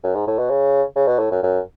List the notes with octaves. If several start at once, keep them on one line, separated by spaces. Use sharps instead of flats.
F#2
G#2
A2
B2
C#3
C#3
B2
A2
F#2
F#2